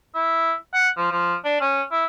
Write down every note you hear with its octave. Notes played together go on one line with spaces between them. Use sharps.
E4
F#5
F3
F3
D4
C#4
E4